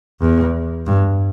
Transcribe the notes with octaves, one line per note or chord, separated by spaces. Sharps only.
E2
G2